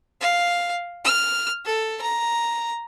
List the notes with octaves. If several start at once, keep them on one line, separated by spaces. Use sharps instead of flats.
F5
F6
A4
A#5